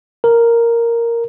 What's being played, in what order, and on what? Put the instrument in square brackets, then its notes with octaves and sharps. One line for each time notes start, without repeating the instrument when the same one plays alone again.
[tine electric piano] A#4